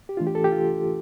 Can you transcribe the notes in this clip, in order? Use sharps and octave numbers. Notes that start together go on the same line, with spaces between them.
G4
E3 A3 D4 F4
G4
A4
G4
F4